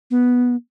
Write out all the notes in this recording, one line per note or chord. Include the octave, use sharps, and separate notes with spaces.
B3